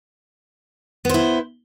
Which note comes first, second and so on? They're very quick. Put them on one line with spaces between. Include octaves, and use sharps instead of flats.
B3 C5 E4